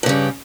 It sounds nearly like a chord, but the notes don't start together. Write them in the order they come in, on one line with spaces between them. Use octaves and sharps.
G2 C#3 G3